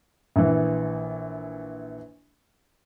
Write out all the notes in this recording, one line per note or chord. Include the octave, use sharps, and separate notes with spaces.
A#1 E3